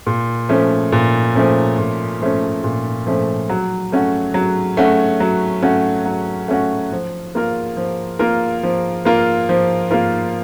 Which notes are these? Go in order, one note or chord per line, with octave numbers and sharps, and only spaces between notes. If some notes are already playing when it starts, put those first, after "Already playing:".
A#2
F3 A3 C#4
A#2
F3 A3 C#4
A#2
F3 A3 C#4
A#2
F3 A3 C#4
F#3
A3 C#4 F#4
F#3
A3 C#4 F#4
F#3
A3 C#4 F#4
F#3
A3 C#4 F#4
F3
A#3 F4 A#4
F3
A#3 F4 A#4
F3
A#3 F4 A#4
F3
A#3 F4 A#4